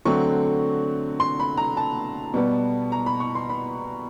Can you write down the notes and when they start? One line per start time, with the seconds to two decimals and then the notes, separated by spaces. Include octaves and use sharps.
0.05 D3 F#3 A3 C4 C#6
1.20 C6
1.40 B5
1.57 A#5
1.77 A5
2.34 B2 G3 B3
2.92 A#5
3.06 B5
3.20 C#6
3.35 C6
3.49 B5